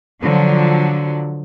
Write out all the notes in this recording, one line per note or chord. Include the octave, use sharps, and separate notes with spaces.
D3 F3 F#3